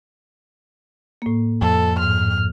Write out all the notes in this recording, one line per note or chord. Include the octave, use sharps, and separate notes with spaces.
A2 A#3
F2 A4
G#2 F6